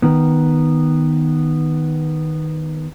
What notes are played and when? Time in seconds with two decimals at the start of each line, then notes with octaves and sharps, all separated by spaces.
0.02 D#3 B3